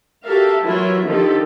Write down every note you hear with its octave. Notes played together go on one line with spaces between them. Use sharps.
F#4 G4 A4 A#4 E5 F5
E3 F#3 E4 F4 A#4 E5
D3 D#3 F3 G4 A4